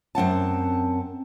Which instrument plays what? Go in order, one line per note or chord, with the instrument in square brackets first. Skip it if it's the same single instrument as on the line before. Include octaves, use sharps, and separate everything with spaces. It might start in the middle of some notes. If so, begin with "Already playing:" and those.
[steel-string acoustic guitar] F#2 C4 F#5 A5